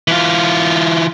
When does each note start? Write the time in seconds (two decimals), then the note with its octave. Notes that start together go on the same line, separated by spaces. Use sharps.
0.08 E3 F4